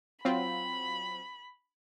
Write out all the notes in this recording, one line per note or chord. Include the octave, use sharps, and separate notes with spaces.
F#3 C4 F4 B5